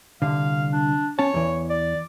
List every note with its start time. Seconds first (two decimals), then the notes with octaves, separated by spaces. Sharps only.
0.22 C2 F2 D3 F5
0.73 D4
1.19 C#4 C#5 A5
1.34 E2 E3
1.70 D5